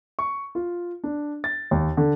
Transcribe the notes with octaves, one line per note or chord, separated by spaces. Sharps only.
C#6
F4
D4
A6
D#2
D3